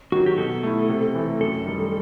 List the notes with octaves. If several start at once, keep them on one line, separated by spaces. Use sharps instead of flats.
D#3 F#3 F#4
G4
B2 A4
A3 E4
C3
E3 A3
F#2 A4
D#3 G3